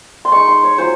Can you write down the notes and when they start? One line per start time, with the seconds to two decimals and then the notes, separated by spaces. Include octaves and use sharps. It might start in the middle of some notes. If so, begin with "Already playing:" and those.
0.25 C6
0.32 G#3 D#4 C#6
0.48 C6
0.63 C#5
0.78 F#3 C#4 F4 C5